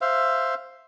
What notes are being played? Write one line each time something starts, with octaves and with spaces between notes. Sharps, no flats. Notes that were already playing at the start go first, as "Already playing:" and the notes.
C5 E5 F5